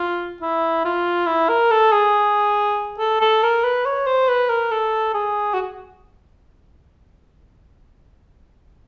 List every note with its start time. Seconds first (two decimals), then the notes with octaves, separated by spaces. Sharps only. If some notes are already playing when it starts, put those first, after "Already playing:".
Already playing: F4
0.42 E4
0.85 F4
1.27 E4
1.49 A#4
1.71 A4
1.92 G#4
2.99 A4
3.21 A4
3.43 A#4
3.64 B4
3.86 C#5
4.07 C5
4.29 B4
4.50 A#4
4.71 A4
5.14 G#4
5.54 F#4